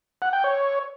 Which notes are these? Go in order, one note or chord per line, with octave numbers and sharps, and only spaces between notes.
F#5
G5
C#5